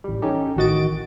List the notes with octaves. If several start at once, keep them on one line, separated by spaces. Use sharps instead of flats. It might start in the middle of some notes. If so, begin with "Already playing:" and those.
A1 G3
C#4 D#4 G4 A4
A1 D#3 F#4 D#5 A6 D7